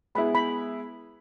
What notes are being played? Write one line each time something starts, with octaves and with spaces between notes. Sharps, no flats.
G#3 B3 E4 B5
B5